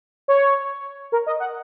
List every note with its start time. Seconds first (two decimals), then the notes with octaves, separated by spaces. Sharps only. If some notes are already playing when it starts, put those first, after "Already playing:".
0.28 C#5
1.12 A#4
1.27 D#5
1.40 F#5